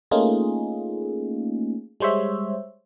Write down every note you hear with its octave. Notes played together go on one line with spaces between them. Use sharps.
A3 A#3 C#4 D#4 F4 G#4
G3 G#3 C5 C#5 E5